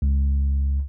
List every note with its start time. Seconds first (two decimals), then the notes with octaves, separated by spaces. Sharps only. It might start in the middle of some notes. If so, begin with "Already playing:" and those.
0.02 C#2